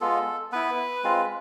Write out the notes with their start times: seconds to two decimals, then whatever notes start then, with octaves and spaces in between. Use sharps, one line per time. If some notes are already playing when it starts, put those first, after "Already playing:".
0.01 G#3 B3 F4 A4
0.52 B3 E4 B4
1.04 G#3 C4 F4